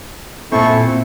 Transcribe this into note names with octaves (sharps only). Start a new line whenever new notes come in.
A#2 C4 E4 A4 C#6
A4